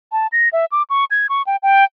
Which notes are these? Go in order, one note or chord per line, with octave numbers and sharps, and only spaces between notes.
A5
A#6
E5
D6
C#6
G#6
C#6
G5
G5